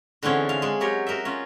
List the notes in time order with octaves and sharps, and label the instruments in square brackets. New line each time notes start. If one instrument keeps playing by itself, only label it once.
[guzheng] D3 E3 C4 C#4 G#4
F5
G#3
F#3 G4 A#4 C#5
F#4 A#4 D#5 E5
C#4 F4